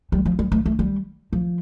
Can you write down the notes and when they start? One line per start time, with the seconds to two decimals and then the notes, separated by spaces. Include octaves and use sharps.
0.12 G3
0.25 F3
0.39 G3
0.52 A3
0.66 A3
0.79 G3
1.33 F3